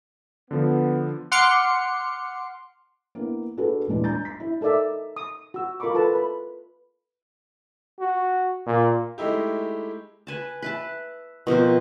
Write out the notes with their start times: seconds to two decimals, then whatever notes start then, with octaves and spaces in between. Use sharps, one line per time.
0.51 D3 F3 B3
1.32 F#5 C6 D6 F6 C#7
3.15 A#3 B3 E4
3.57 D4 F#4 G#4 A4 B4
3.87 D#1 E3 G#3 D4 B4
4.04 A#5 G6 A6
4.25 B6
4.40 E4
4.61 D#4 A4 A#4 D5 E5
5.17 D#6
5.54 F#4 E6
5.80 F4 A#4 D#5 B5 C#6 D6
5.95 A4 B4 A5
6.12 B4 B5
8.00 F#4
8.66 A#2
9.18 G#3 A3 D#4 E4 G4
10.27 B4 G#5 A5
10.62 B4 E5 A5
11.47 B2 F3 C4 A#4